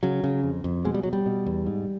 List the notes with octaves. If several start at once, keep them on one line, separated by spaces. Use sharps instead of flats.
C#3 F#3
C#3
F2
F2
B2 G#3
G3
B2 F#3
G3
B2
E2
G#2